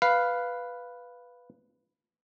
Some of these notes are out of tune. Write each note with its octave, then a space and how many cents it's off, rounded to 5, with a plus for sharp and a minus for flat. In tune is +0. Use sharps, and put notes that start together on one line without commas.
B4 +0 F5 +0